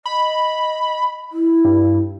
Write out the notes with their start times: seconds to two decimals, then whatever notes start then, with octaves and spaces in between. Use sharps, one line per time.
0.06 D#5 B5
1.32 E4
1.64 G2